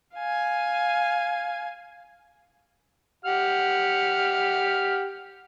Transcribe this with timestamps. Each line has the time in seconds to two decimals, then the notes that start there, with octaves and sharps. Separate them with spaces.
0.15 F5 G#5
3.25 G4 F#5 F6